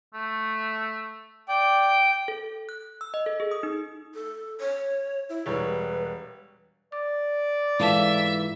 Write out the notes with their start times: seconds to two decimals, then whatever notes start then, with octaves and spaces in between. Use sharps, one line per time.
0.14 A3
1.49 D5 G5
2.28 A4
2.69 F#6
3.01 E6
3.14 D#5
3.26 A4
3.40 G#4
3.51 D#6
3.63 D#4
4.14 A4
4.60 C#5
5.29 E4
5.46 E1 G3 B4 C#5
6.92 D5 D6
7.80 G#2 E3 F4 A4 E5 F5 A5